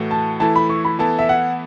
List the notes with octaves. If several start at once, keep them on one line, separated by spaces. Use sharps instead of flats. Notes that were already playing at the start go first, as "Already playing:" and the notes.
Already playing: A2 E3 A3 F#4
A5
E3 A3 E4 A4 A5
B5
C#6
B5
E3 B3 E4 A4 A5
E5
F#5